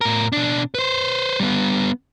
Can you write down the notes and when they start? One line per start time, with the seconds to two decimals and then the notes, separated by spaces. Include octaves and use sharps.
0.01 A2 A#4
0.32 B2 D4
0.74 B4 C5
1.40 G3 B3